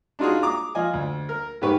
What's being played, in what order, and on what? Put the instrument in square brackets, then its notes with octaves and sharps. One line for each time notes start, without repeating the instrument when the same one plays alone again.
[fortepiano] D4 D#4 F4 F#4 G#4
A#5 D6 D#6
F3 D#5 G#5
D2
A#4
G#2 D#3 G4 B4 C#6